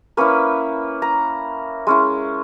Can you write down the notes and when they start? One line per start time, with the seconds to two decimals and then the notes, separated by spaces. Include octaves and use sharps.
0.17 A#3 C#4 E4 B4
1.02 A#5
1.87 G#3 C#4 E4